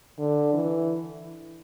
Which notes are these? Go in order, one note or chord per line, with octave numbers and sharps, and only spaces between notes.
D3
E3